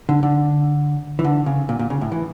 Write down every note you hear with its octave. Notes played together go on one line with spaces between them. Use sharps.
D3
D3
E3
D3
C#3
A#2
A#2
C#3
A2
E3